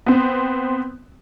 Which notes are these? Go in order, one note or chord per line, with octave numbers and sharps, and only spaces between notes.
B3 C4